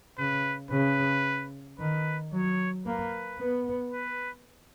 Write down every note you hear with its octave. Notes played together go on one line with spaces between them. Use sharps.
C#3 B4
C#3 B4
D#3 B4
F#3 C#5
A#3 B4
B3
B4